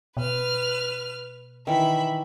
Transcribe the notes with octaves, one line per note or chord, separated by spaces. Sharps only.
B2 B4 F6
D#3 E3 E5 B5